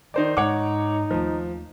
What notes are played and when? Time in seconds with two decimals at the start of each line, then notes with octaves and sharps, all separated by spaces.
0.14 D#3 D#4 C5 D5
0.37 G#2 D#4 C#5 F#5 D6
1.11 D#2 F3 A3